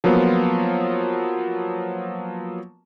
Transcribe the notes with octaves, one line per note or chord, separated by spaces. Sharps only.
F3 F#3 A#3 B3 F4